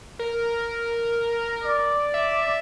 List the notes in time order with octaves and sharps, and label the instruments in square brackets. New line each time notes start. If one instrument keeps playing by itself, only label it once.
[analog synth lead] A#4
[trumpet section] D5
[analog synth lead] E5